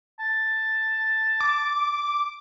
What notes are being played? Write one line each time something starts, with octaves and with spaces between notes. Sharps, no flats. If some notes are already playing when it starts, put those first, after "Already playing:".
A5
D6